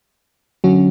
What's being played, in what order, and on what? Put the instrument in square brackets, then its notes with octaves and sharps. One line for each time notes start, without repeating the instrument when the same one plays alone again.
[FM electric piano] D3 F#3 C#4 F#4